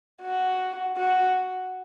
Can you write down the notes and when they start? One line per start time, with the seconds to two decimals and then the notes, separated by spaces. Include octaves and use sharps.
0.22 F#4
0.97 F#4